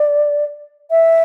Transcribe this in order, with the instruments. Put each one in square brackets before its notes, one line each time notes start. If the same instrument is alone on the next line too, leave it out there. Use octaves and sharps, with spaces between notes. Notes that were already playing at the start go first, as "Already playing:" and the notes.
Already playing: [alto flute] D5
E5